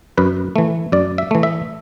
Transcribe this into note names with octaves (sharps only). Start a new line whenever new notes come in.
F#2 B4
E3 A3
F#2 D5
E5
E3 A3
E5